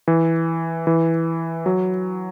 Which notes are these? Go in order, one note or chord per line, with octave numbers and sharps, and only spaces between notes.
E3
E3
F#3